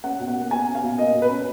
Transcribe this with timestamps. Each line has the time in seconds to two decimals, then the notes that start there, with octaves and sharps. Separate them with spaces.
0.04 C#4 F#5
0.20 B2
0.28 F#5
0.35 A#3
0.51 B2 G#5
0.67 C#4
0.75 F5
0.83 B2
0.98 A#3 D#5
1.14 B2
1.22 B4
1.30 C#4